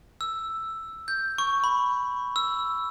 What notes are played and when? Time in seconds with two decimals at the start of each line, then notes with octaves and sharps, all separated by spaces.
0.21 E6
1.08 G6
1.38 C#6
1.64 B5
2.36 E6